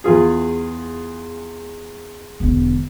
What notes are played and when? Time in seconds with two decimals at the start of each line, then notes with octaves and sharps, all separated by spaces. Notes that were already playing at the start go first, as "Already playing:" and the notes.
0.04 E2 F4 G#4
2.40 E1 D3